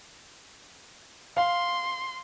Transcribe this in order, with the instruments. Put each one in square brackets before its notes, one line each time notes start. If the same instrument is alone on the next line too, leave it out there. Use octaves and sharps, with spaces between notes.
[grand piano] F5 [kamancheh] C6